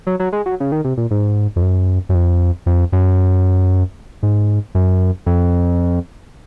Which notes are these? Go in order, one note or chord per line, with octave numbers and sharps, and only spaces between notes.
F#3
F#3
G#3
F#3
C#3
D#3
C3
A#2
G#2
F2
F#2
F#2
F2
F2
F#2
G#2
F#2
F2